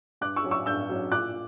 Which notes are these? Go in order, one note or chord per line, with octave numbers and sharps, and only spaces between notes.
G2 D6 F#6
C#6 E6
F#3 C#4
C#6 E6
G2 E6 G6
F#3 C#4
A#2 D6 F#6